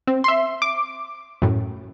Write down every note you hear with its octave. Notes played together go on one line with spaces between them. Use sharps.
C4
E5 C6
D6
F#2 A2